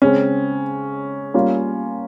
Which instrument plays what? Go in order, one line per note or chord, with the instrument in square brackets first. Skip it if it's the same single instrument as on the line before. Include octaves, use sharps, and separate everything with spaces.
[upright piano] C#3 G#3 C4 [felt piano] C#4
[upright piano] G3 A#3 C#4 F4